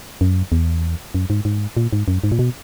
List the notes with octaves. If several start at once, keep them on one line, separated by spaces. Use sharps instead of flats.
F#2
E2
F#2
G#2
G#2
A#2
G#2
F#2
G#2
A#2
B2